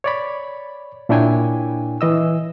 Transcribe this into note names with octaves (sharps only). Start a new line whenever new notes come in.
C#5 D5 B5
A#2 D4 E4 C#5 G5 G#5
E3 D#5 E6